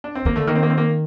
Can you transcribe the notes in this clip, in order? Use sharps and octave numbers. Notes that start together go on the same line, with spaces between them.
D4
C4
D#3 A#3
D3 A3
D#3 A#3
C4
A#3
C4
A#3